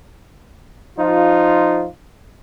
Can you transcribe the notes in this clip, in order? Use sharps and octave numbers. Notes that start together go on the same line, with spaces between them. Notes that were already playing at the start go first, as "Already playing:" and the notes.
F3 D#4 F4